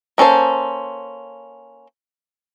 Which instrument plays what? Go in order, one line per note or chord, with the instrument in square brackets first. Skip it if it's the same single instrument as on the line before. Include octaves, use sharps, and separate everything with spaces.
[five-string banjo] A#3 C#4 A4 C5